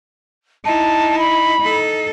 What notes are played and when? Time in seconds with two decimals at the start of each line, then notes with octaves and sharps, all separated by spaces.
0.65 D#4 E4 A5
1.19 B5
1.61 D#4 A4